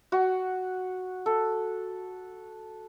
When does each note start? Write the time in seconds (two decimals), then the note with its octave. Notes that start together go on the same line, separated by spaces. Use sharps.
0.12 F#4
1.26 A4